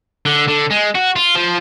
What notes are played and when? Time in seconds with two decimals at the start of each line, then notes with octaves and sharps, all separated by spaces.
0.26 D3
0.48 D3
0.70 G#3
0.95 F#4
1.16 F4
1.35 F3